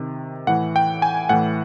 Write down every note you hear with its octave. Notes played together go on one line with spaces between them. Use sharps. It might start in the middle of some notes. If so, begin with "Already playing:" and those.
Already playing: C3 D#3
A2 E3 F#5
G5
G#5
A2 E3 F#5